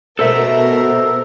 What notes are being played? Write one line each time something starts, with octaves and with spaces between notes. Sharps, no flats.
B2 A4 A#4 C5 E5